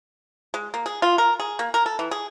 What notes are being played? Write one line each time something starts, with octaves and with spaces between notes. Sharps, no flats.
G#3
A#3
G#4
F4
A#4
G#4
A#3
A#4
A4
E3
G#4